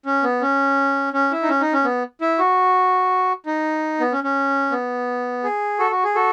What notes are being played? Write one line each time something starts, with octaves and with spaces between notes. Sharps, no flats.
C#4
B3
C#4
C#4
E4
D#4
C#4
D#4
C#4
B3
E4
F#4
D#4
B3
C#4
C#4
B3
G#4
F#4 A4
F#4
G#4
F#4 A4